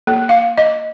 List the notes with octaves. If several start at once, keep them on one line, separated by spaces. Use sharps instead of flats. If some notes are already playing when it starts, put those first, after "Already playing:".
A#3
F5
D#5